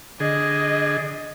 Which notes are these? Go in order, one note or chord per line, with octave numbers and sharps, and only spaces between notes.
D3 G#4 D#5